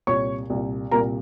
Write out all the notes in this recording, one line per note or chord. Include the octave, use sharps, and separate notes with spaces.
C2 A#2 C#5 C#6
C2 A#2
C2 A#2 A#4 A#5